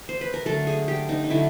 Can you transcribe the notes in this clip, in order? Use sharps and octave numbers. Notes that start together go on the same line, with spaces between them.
C5
B4
A#4
D3 F#3 A3 A4
G#4
G4
D#4
D#4
D3 F#3 A3 E4